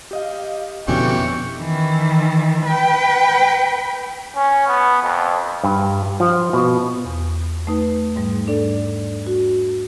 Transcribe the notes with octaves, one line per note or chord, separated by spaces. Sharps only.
G4 D#5 F5
F2 B2 D3 E3 C#4 G4 C#6
D#3 E3
B4 G5
C#4
B3
F2
G2
F3
B2
E2
A3 D#4 B4
G#2 G3
D4 A4 D5
F#4